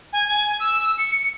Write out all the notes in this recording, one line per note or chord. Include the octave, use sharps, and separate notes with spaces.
G#5
G#5
E6
C#7